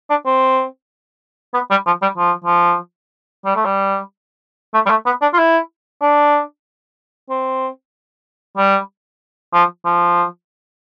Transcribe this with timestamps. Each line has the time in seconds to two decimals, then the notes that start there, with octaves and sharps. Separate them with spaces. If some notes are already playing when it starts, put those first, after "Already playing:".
0.10 D4
0.26 C4
1.54 B3
1.71 G3
1.86 F3
2.02 G3
2.18 F3
2.45 F3
3.45 G3
3.56 A3
3.65 G3
4.74 A3
4.86 G3
4.90 A3
5.06 B3
5.22 D4
5.33 F4
5.38 E4
6.02 D4
7.30 C4
8.57 G3
9.53 F3
9.85 F3